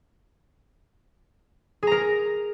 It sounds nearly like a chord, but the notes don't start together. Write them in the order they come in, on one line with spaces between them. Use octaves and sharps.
G#4 A#5 A#4